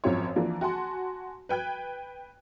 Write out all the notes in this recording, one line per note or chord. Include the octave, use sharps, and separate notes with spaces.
G#1 F#2 F3 C4 C#5
E3 F3 A#3 D4
F#4 F#5 G#5 A5 C6
B4 G5 F#6 G#6